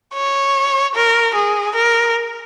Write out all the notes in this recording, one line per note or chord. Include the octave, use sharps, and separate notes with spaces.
C#5
A#4
G#4
A#4